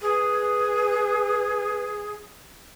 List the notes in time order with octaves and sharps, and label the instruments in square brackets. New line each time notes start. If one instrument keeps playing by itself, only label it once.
[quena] G#4 [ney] B4